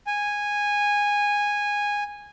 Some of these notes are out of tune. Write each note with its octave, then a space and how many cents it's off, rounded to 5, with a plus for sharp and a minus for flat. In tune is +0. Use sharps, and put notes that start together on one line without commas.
G#5 -10